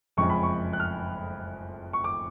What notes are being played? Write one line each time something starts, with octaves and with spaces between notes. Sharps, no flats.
F#1 F2 C#3 G#3 C#6
B5
C#6
F#6
F6
C#6
D6